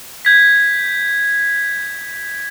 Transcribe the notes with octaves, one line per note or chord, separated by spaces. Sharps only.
G6 G#6 B6